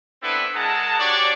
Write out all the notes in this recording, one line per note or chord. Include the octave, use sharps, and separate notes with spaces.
B3 C4 D4 E4 A4 B4
G#3 G#4 A#4 F#5 A5
D4 F#4 G4 C#5 D5